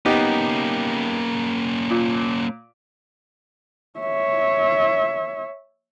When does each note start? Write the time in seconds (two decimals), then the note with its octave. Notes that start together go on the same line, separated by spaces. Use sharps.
0.06 A#3 B3 C#4 D#4 G4
1.90 A#2
3.99 C#5 E5